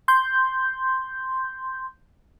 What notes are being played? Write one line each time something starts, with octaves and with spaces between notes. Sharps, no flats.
C6 G6